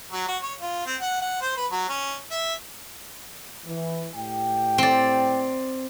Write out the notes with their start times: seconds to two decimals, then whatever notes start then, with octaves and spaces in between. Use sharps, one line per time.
0.12 F#3
0.28 F#4
0.42 C#5
0.60 F4
0.86 C4
1.00 F#5
1.21 F#5
1.41 C5
1.57 B4
1.72 F#3
1.89 C#4
2.31 E5
3.66 E3
4.15 A2 G4 G5
4.78 C4 D5